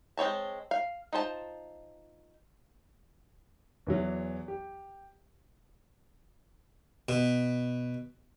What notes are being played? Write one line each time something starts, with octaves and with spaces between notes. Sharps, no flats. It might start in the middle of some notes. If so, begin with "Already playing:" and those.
G#3 C4 C#5 A5
F5
D#4 F4 C5 A5
E2 E3 F#3
G4
B2